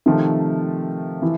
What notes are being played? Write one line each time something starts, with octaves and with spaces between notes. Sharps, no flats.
C3 D#3 F3 A3
E3